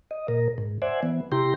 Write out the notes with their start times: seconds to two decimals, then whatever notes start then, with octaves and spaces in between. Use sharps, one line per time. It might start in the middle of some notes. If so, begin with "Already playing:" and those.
0.11 D#5
0.28 A#2 A#4
0.58 G#2
0.82 C5 D5 E5 F#5 G#5
1.03 E3 B3
1.32 C3 E4 G4 G5 A#5 C6